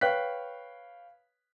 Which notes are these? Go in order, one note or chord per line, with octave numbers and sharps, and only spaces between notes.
B4 C#5 F5 G5 F#6 B6